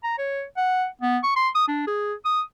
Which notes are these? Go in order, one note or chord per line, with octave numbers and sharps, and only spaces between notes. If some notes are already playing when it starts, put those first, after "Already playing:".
A#5
C#5
F#5
B3
C#6
C6
D#6
D4
G#4
D#6